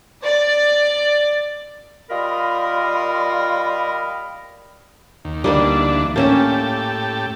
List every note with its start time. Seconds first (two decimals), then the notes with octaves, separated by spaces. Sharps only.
0.23 D5
2.10 G3 F4 A#4 D#5 F5 B5
5.25 D#2
5.44 D2 E3 G3 A#3 D4 D#4
6.16 A2 A#3 C#4 G4 E5 A5